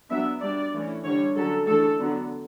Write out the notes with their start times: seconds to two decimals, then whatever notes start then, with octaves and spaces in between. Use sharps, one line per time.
0.10 F#3 B3 D4 E5
0.41 G3 D4 D5
0.74 E3 A3 C#4
1.04 D3 G3 D4 C#5
1.36 D3 F#3 C#4 A4
1.67 E3 A3 D4 A4
1.99 D3 F#3 B3 D4